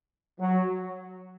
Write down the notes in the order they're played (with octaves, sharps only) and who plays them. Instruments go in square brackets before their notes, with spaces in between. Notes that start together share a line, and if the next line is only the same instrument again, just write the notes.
[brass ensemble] F#3